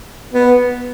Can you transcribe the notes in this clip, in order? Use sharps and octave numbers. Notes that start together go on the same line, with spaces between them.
B3